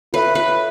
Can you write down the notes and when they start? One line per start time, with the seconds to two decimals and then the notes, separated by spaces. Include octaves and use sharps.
0.13 F4 A4 B4 C#5 E5
0.35 B4